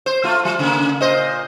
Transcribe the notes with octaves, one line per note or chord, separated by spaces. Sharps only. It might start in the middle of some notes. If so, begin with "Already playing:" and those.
C5
A3 F4
F#3
C#3 A#3
A#2 C5 D#5